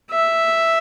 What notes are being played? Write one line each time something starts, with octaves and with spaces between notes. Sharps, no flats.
E5